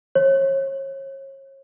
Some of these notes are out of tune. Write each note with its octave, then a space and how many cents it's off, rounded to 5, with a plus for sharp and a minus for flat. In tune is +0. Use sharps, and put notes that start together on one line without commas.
C#5 -35